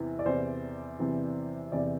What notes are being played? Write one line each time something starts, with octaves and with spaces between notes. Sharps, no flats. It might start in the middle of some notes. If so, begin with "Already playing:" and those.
Already playing: E2 C3 E3
D5
E2 C3 E3 C5
E2 C3 E3
E2 C3 E3 D5